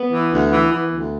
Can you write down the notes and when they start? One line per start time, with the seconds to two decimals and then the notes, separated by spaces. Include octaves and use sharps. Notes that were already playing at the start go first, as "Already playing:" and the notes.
Already playing: B3
0.13 E3
0.32 D2
0.52 E3
0.72 E3
0.92 D2